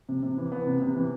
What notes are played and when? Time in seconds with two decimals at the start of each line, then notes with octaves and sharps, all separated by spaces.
0.09 C3
0.23 C3
0.38 E3
0.52 B3
0.67 C3
0.81 C3
0.96 E3